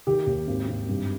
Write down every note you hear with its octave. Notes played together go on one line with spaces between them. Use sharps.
D#3 G4
D#2
G#1
G#1
G2